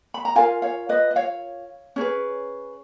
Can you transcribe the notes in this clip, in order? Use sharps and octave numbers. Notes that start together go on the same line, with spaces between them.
B5
A#5
F4 A#4 F5 G#5
C#5 F5
B4 D#5
D#5
C#5 F5
C#4 G#4 B4